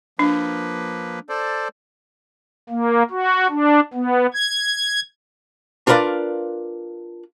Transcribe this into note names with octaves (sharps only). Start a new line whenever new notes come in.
F3 A#3 D4 B4
A4 C5 D5
A#3
F#4
D4
B3
G#6
D4 F4 A#4 B4 D5 F5